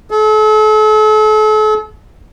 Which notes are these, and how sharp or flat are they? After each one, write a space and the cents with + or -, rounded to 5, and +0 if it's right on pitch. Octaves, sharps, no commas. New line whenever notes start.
A4 -40